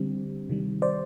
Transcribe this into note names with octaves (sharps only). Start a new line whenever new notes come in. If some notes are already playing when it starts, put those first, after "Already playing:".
Already playing: D3 G3 C4
C3 D#3 G3
C5 D5